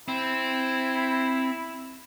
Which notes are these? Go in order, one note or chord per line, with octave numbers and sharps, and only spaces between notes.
C4 E4